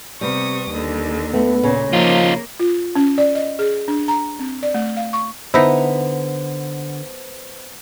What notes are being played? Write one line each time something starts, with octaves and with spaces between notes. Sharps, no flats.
C3 G3 B3 C#6 D#6
D#2 D3
A3 B3
A#2 C#3
F3 A#3 D#4 F4
F4
C#4
D5
D#5
G#4
D4
A#5
C4
D5
A3
F5
C#6
D3 B3 D#4 E4 C5 A#5